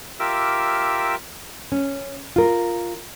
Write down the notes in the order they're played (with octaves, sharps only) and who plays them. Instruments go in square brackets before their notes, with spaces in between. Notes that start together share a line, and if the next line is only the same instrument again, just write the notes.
[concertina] F4 G4 A#4 E5 D6 E6
[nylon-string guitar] C#4
F4 A#4